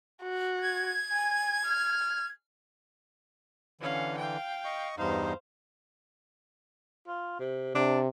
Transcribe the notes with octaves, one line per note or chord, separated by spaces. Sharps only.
F#4
G#6
G#5
F6
D3 E3 C#4 F5
F5 G5
D#5 C#6
E2 G2 D#4 C5 F5
F4
C3
C3 D4